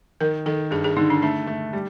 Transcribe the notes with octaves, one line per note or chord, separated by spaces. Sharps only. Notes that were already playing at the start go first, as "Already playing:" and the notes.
D#3 A#4
D#3 A4
G2 G#4
G#4
D3 D#4
D4
A3 D4
A3
G3